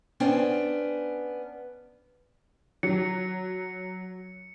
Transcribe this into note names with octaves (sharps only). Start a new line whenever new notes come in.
B3 C#4 D4 C5 G5
F#3 C#7